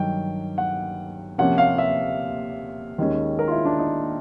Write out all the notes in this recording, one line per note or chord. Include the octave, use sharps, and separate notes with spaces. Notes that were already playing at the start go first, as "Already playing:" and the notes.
Already playing: G2 D#3 F#3 G5
F#5
C3 F3 A#3 C#4 F#5
F5
E5
D#2 D#3 G#3 C#4
A#4
F4
E4
D4
D#4